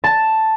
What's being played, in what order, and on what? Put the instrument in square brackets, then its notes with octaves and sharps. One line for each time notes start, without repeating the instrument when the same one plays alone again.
[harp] A5